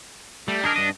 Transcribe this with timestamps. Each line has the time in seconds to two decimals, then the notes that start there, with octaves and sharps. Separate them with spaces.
0.48 G3 A3
0.64 D4 D#4 G#4 A#4
0.76 G2 D#5